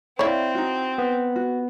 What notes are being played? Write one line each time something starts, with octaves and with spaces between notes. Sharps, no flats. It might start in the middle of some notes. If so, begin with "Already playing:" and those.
C4 E4 C#5 D5 E5 F5
D#4 F#4
B3
F#4